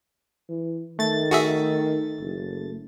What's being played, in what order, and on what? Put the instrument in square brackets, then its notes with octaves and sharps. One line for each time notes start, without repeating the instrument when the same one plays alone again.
[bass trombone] E3
[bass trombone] D#3 [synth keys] A3 A6
[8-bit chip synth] F#4 G#4 E5
[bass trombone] F#1